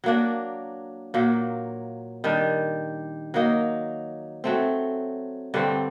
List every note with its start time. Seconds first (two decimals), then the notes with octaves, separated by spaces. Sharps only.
0.04 F#3 A#3 D4
1.14 A#2 F#3 A#3
2.24 D#3 G3 D4
3.34 F#3 A#3 D#4
4.44 F#3 A3 C4
5.54 G2 D3 G3 C4